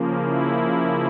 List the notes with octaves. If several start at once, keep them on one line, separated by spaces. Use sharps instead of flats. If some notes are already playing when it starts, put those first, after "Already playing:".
Already playing: C#3 F3 A#3
E4